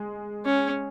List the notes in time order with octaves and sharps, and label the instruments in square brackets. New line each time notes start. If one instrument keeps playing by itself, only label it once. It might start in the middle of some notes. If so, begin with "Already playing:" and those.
Already playing: [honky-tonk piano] G#3
[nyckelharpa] C#4